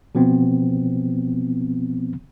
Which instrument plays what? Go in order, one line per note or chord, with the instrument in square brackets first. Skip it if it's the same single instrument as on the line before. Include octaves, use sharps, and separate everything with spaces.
[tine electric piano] B2 F3 B3 C4